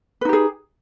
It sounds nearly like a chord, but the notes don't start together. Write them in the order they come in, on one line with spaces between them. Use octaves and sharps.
B4 D#4 G4 G#4